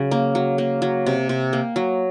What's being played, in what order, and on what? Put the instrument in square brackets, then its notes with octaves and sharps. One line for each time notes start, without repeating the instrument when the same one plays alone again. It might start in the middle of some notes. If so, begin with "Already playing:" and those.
Already playing: [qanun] C#3 F#3
A#3
F#3
A#3
F#3
C3
C3
A#3
F#3